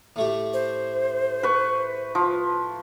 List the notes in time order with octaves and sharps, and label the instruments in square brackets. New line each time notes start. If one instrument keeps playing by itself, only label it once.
[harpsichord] A2 A3 G4
[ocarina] C5
[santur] B4 C#6
F3